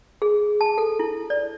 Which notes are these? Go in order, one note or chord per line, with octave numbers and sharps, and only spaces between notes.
G#4
A5
A4
E4
D5